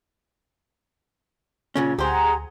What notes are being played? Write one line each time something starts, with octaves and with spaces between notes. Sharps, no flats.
A#2 C#3 C#4
D2 G4 G#4 C5 F#5 A#5